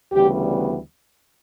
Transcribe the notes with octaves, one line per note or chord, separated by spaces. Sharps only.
D2 C#3 E3 G3 B3 G4